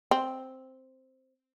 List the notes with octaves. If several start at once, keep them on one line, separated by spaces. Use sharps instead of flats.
C4